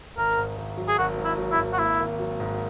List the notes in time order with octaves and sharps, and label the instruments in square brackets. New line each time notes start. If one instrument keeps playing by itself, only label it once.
[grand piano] G#1 [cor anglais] A#4
[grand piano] G#2
G#1
F#3
[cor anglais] G#4
[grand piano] G#1 [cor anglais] F#4
[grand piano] G#2
[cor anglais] E4
[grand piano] F#3
[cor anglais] E4
[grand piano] G#1
[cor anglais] F#4
[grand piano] A#3 [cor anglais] E4
[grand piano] G#1
F#3
G#2